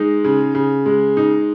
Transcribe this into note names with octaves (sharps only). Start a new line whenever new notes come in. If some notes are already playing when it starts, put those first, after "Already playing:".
Already playing: G#3 D#4
C#3
C#3
G#3
D#4